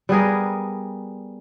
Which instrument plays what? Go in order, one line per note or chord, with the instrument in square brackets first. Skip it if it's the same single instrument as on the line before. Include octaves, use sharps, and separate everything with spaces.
[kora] G3 B3 G#4 A#4